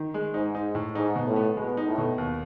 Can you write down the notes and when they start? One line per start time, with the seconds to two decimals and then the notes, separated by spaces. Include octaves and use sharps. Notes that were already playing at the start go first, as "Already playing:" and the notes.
Already playing: D#3
0.14 G#3
0.34 G#2 D#4
0.55 D#4
0.75 A2
0.95 G#2 D#4
1.16 B2
1.27 A2
1.36 B3
1.56 B2 G#3
1.77 D#4
1.87 A2
1.98 B2
2.18 D#2